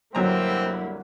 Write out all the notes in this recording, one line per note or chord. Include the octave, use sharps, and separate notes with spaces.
C2 F#2 D3 F#3 A#3 C4 E4 A#5